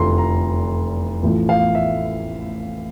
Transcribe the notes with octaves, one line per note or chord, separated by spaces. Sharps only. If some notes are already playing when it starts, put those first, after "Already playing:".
Already playing: F1 E2 D3 F3 A#5 C6
A#5
A1 A2 F3
F5
E5